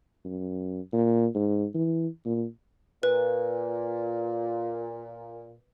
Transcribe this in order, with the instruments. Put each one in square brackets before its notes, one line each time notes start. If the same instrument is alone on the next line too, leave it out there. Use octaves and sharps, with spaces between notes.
[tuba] F#2
A#2
G#2
E3
A#2
[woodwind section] A#2 [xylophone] B4